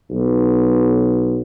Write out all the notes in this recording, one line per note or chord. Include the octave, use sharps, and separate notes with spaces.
B1